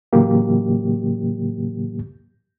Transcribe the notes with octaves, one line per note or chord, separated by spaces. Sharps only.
A2 C#3 E3 F#3 A#3 G4